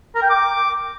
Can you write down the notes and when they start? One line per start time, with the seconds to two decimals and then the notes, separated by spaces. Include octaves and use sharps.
0.15 A#4
0.22 G5
0.30 D6